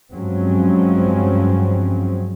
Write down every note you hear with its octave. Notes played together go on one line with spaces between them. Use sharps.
G2 F3 F#3 G#3 C4 C#4